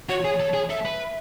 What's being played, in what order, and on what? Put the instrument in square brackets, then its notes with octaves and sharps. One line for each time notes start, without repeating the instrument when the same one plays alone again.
[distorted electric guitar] F#4 [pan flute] C#5
[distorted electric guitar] G#4
A4
G#4
[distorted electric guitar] A4 [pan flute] E5
[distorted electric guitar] B4